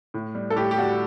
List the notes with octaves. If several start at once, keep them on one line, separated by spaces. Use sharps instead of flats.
A2
G3
A4
A2 G4
G4
G3 F#4